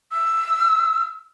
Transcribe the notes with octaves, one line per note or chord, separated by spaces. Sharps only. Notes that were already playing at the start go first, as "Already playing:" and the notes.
E6